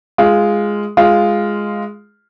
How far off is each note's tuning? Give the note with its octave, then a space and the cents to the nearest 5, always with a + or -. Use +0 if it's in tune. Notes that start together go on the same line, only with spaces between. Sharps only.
G#3 +0 F4 +0
G#3 +0 F4 +0